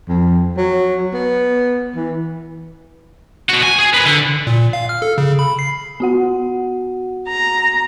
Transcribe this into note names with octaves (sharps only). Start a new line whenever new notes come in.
F2
F#3
B3
E3
B2 F#4
G#5
G#4
A#4 B4
D3
A#2
F5
F6
A4
C#3
B5
C7
B3 F#4 F#5
A#5